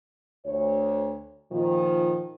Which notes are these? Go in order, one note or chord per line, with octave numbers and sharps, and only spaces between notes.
D2 C#5
A#2 D#3 F3